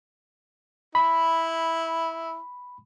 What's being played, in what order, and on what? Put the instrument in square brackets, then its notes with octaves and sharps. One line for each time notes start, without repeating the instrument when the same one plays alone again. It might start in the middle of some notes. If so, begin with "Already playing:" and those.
[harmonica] E4 [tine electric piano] B5